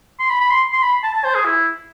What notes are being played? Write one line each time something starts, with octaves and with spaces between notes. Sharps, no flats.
C6
B5
B5
C6
C6
B5
A5
A5
C5
G#4
E4